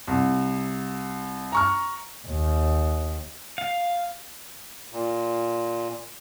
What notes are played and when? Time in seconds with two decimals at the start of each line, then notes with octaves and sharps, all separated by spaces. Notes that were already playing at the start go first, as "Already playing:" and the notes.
0.07 C2
1.52 A#5 C#6 F6
2.27 D#2
3.58 F5
4.93 A#2